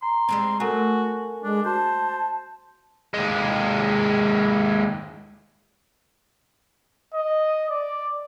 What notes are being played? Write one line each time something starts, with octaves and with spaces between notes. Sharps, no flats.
A#5 C6
G3 G#3 C4
A3 F#4 A4 A#4 G#5
G#3 D4
F#4 C5 A5
D#2 G#3
D#5
D5